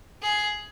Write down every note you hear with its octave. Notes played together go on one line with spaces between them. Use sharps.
G#4